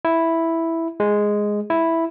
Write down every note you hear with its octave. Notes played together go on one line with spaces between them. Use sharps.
E4
G#3
E4